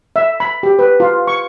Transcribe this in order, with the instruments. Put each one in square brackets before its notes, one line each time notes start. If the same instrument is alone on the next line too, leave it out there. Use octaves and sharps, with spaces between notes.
[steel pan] E5
B5
G4
B4
F4
C#6